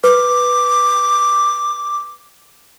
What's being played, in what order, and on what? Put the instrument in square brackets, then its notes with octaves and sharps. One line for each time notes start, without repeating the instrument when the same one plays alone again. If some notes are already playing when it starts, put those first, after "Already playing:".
[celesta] B4 [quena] D6